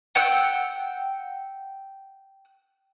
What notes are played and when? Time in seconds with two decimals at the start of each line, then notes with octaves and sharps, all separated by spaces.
0.15 F#5 G5 E6